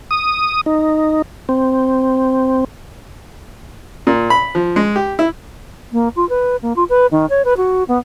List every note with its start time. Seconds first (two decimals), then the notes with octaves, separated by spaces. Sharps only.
0.11 D#6
0.66 D#4
1.49 C4
4.07 A#2
4.30 B5
4.55 F3
4.76 G#3
4.96 G4
5.19 E4
5.92 A#3
6.16 F4
6.29 B4
6.62 A#3
6.76 F4
6.89 B4
7.11 D#3
7.30 C#5
7.45 B4
7.57 F#4
7.88 B3